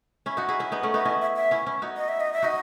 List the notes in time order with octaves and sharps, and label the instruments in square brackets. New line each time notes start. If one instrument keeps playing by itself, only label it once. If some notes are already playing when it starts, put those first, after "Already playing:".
[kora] C#4 E4
D#4 F#4
E4 G#4
C#4 E4
B3 D#4
A3 C#4
[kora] B3 D#4 [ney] E5
[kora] C#4 E4 [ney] D#5
[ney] E5
E5
[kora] C#4 E4
C#4 E4
D#4 F#4
[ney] D#5
E5
D#5
E5
[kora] D#4 F#4 [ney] D#5